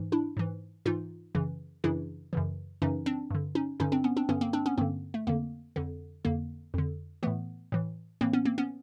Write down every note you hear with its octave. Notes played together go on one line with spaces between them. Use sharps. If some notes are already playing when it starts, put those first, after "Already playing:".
Already playing: G#2 E3
D4 E4
G#2 E3
G#2 E3 D#4 F4
F#2 C#3 E3
F#2 C#3 E3 D4 E4
F#2 C#3 E3
F#2 C#3 E3 C#4 D#4
C4 D4
G2 D3
C#4 D#4
G2 D3 C#4 D#4
C4 D4
B3 C#4
C4 D4
G2 D3 B3 C#4
A#3 C4
C4 D4
B3 C#4
G2 D3 A#3 C4
A3
F2 D3 A#3
F2 D3
F2 D3 A#3
F2 D3
A2 E3 A3 B3
A2 E3
A2 E3 A#3 C4
B3 C#4
A#3 C4
B3 C#4